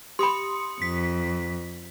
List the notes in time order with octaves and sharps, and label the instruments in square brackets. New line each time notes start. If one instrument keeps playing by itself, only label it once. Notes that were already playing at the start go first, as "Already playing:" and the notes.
[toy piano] G4 B5 [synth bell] C6 D#6 C#7
[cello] F2 [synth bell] B6